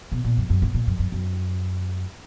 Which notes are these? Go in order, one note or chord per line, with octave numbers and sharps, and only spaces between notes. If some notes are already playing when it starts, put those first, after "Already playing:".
B2
A#2
F#2
F#2
G#2
A#2
F#2
F#2
F#2